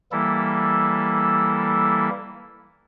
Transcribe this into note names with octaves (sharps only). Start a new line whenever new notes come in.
E3 G3 A#3 E4 A4